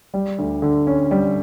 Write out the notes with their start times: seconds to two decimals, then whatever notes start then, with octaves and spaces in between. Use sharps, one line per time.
0.14 G3
0.39 D2
0.62 D3
0.87 C#4
1.11 G3